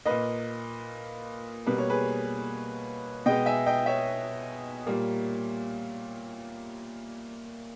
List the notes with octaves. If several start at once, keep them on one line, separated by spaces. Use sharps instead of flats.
A#2 A#3 B4 D#5
B2 G3 A#3 B4
C#5
G#4 B4
B2 G#3 B3 D#5 G5
E5 G#5
D#5 G5
C#5 E5
A#2 G3 A#3